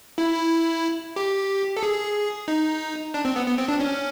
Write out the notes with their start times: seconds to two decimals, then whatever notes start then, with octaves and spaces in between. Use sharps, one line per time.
0.18 E4
1.16 G4
1.77 A4
1.83 G#4
2.48 D#4
3.14 D4
3.25 C4
3.36 B3
3.47 B3
3.58 C4
3.68 D4
3.80 C#4